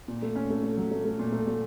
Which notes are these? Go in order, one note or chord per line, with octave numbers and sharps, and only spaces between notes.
A#2
A3
C#4
A3
A3
F#3
A3
A3
A#2
A3
A3